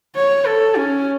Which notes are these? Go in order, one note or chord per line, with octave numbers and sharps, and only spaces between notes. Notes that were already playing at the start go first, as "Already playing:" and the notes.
C#5
A4
C#4